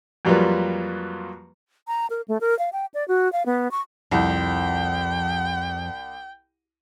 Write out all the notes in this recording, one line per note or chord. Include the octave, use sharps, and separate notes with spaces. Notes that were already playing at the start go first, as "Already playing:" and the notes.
F2 F#3 G3 A#3 F4 B4
A#5
A#4
A3
A#4
F5
G5
D5
F#4
F5
B3
C#6
C2 F2 F3 G5